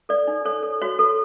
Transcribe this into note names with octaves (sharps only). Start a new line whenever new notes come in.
A4 D5
D#4
A4 C#5
A4
F#4 C#5
A4